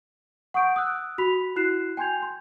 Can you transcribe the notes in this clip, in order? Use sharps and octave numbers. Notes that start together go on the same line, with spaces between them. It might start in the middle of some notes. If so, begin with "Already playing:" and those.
F#5 C#6 D#6 G6 D7
D#6 E6 F#6
F#4 B5 B6 F7
E4 F#4 F#6 C7 E7
G5 G#5 C6 G6 G#6 F7
C6